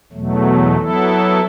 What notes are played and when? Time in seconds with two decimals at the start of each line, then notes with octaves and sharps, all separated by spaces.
0.12 E2 B2 F#3 A3
0.76 F#3 B3 E4 A4